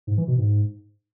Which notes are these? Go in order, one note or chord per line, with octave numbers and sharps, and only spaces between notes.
G#2
E3
B2
G#2